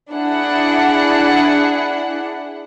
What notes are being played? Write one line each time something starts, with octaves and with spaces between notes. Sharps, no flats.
D4 E4 G#4 F#5